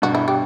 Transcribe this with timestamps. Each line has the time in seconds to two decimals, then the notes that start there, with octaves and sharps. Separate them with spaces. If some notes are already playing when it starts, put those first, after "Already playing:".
0.02 G2 B2 F#4
0.15 E4
0.28 G4